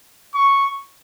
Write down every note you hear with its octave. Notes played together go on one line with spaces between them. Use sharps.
C#6